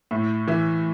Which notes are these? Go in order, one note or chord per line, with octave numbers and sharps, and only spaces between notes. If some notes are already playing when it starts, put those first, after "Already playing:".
A2 E5
E3 E5